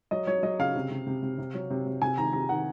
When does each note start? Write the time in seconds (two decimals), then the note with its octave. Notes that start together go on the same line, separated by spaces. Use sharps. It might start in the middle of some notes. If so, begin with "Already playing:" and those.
0.11 F#3 D#5
0.27 F#3 C#5
0.43 F#3 D#5
0.59 C#3 F5
0.75 C3
0.91 C3
1.07 C3
1.22 C3
1.38 C3
1.54 F#3
1.70 C3
1.86 C3
2.02 C3 G#5
2.17 D#3 A#5
2.33 C3 A#5
2.49 D#3 F#5